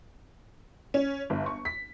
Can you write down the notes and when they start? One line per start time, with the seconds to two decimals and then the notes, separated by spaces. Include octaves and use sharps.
0.94 C#4
1.30 G1
1.46 C#6
1.65 B6